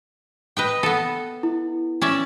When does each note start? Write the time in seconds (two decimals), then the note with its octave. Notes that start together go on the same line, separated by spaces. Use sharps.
0.57 B4 D#5 G5
0.83 B3 A4
1.43 E4
2.01 C#4 D5 E5